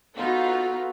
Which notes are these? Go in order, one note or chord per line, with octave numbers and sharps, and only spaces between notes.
B3 D#4 F4 F#4 A4